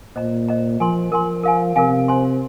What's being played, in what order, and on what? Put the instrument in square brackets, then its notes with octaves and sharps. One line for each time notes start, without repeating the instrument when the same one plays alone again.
[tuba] A#2 [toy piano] C5 D#5 A#5
[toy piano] C5 D#5 A#5
[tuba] F3 [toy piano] A#4 G#5 C6
[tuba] F3 [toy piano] A#4 G#5 C6
[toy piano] A#4 F5 G#5
[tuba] C3 [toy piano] A#4 F5 G#5
[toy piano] C5 G#5 C6